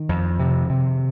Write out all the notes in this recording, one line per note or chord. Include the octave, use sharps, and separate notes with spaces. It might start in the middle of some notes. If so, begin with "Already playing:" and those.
Already playing: D#3
F2
C3
C3